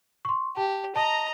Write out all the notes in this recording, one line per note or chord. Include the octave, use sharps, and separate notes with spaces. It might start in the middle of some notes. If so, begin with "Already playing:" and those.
C6 C#6
G4 A5
D#5 A5 A#5